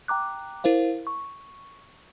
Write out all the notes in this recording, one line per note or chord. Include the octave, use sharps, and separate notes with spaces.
G5 A#5 D6 F#6
E4 A#4 C5 F5
C#6